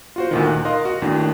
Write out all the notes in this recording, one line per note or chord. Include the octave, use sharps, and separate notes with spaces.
F4 F#4 C5
D2 A#2 D#3
F#6
A#4 D#5 F5 C6
F#4
D#2 A2 D4